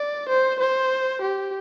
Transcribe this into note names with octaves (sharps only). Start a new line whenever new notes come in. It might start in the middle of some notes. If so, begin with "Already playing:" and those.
Already playing: D5
C5
C5
G4